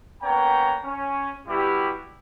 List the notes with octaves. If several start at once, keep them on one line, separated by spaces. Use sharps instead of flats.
A#3 B3 C#4 C#5 G5 A#5
C#4
G3 B3 E4 F#4 G4